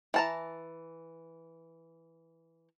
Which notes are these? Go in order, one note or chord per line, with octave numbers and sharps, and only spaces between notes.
E3 A5 A#5